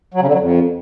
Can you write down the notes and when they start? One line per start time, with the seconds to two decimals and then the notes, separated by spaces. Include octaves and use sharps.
0.14 F#3
0.21 C#3
0.27 D3
0.33 F#3
0.40 F2